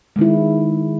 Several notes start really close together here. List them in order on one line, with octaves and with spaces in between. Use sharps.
G#3 D#3 E4